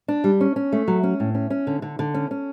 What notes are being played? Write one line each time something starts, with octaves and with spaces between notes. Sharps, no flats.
D4
G3
C#4
C#4
A3
F#3
C#4
A2
C#4
C#4
D3
D3
D3
C#4
C#4